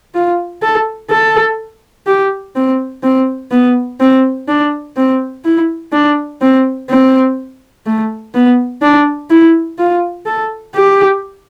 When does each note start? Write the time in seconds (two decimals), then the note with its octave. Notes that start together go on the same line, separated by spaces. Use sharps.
0.14 F4
0.62 A4
1.10 A4
2.07 G4
2.55 C4
3.03 C4
3.51 B3
4.00 C4
4.48 D4
4.96 C4
5.45 E4
5.92 D4
6.41 C4
6.89 C4
7.86 A3
8.34 B3
8.82 D4
9.30 E4
9.78 F4
10.26 A4
10.74 G4